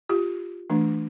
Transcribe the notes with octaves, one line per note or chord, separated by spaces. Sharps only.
F4 G4
E3 A3 D4